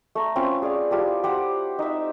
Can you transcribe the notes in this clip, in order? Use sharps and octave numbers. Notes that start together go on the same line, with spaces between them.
A3 A#5
C4 C#4 F4 B4
G#4 D5 F5
E4 F4 G4 A4
G4 C5 F#5
D#4 E5